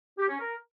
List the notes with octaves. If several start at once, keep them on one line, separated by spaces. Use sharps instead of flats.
G4
C#4
A#4